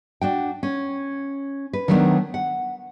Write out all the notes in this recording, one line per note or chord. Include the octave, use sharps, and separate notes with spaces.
D4 F#4 G5
C#4
B4
D#3 F#3 G3 A3 B3 D4
F#5